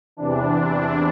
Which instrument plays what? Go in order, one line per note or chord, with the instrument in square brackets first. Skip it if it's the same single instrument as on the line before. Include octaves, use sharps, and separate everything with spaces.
[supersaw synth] E2 C3 E3 D4